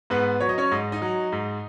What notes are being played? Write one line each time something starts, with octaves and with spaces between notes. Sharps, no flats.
G#2 B3 B4
F#3 C#5
D#5
C#4 C#5
G#2 D#5
D#4 D#5
F#3
G#2